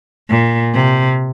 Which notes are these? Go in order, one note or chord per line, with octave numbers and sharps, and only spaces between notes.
A#2
C3